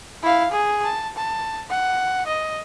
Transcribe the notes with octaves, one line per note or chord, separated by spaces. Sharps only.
E4 F5
G#4
A5
A5
F#5
D#5